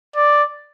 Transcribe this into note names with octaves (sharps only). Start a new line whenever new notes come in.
D5